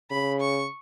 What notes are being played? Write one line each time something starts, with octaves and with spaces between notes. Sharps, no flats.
C#3 B5
C#6